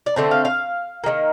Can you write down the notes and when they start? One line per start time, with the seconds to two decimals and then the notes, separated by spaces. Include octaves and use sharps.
0.06 D5
0.16 D3 A3 C4 C5
0.31 F5
0.45 F5
1.04 D#3 G3 A#3